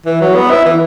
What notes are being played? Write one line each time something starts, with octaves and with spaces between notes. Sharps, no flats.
E3
F#3
B3
E4
E3